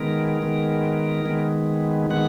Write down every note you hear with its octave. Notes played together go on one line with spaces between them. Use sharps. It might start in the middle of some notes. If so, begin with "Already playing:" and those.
Already playing: D#3 G#3 B3 A#4
D#3 G#3 B3
D#3 G#3 B3
D#3 G#3 B3 F#5